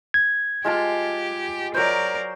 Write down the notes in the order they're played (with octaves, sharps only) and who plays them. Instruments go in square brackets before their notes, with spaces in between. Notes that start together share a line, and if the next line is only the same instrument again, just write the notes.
[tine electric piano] G#6
[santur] G#3 F4 A5 [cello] G4
[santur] F#3 C5 [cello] A#4 D5